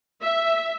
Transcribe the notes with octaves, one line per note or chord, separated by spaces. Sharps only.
E5